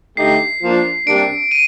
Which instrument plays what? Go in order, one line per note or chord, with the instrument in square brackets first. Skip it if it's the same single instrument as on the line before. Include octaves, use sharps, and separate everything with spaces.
[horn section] D3 A3 D#4 G4 [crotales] C7
[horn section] F3 A#3 D4
[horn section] C3 G3 A#3 D4 [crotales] D7
[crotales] D#7